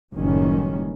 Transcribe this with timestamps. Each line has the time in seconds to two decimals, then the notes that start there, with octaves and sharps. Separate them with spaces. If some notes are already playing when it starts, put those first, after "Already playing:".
0.15 F#1 A2 D#3 E3 G3 C#4